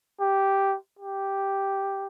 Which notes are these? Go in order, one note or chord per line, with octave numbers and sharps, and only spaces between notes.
G4
G4